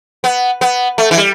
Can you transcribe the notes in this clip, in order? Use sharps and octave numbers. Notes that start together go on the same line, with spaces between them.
B3
B3
A3
E3
G3